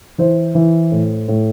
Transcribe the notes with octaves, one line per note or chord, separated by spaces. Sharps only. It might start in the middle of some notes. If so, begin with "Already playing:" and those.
E3 C5
E3
A2
A2